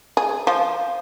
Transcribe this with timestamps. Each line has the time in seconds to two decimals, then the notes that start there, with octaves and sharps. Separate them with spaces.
0.17 G#4
0.47 F3